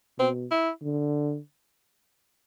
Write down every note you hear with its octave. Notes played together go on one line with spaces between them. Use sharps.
B2 C4
E4
D3